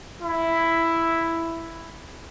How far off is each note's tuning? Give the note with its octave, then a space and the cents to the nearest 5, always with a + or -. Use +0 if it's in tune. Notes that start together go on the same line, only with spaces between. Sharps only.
E4 +5